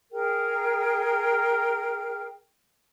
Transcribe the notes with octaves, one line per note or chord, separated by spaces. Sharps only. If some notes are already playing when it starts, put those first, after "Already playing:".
G#4 A#4 G5